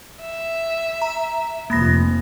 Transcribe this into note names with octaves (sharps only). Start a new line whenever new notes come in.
E5
A#5
F1 F3 A#3 B5 A#6